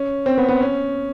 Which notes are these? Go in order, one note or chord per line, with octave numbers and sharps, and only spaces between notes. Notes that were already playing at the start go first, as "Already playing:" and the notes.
Already playing: C#4
C4
B3
B3
C#4